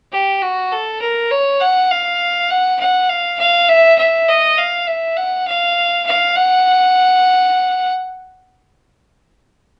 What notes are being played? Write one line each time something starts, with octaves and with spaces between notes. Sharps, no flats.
G4
F#4
A4
A#4
C#5
F#5
F5
F#5
F#5
F5
F5
E5
E5
D#5
F5
E5
F#5
F5
F5
F#5